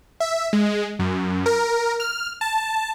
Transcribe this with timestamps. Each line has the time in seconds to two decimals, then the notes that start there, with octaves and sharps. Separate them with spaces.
0.20 E5
0.53 G#3
0.99 F#2
1.46 A#4
2.00 F6
2.41 A5